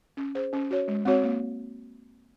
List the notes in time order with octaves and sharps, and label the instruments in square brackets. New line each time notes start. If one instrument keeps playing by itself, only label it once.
[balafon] C#4
G#4 C5
C#4
F#4 C#5
G#3
C4 F#4 C#5
A#3